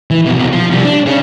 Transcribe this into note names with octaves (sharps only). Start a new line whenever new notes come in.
E3
C2 B2
F3 F4
C3 G3
D4
C#4 G#4